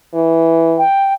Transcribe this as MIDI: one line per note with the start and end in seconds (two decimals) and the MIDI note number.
0.14 0.81 52
0.78 1.14 79